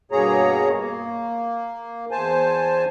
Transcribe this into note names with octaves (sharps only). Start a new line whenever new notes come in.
G2 B2 A#3 G#4 C#5 A#5
A#3
E2 C5 G#5 A5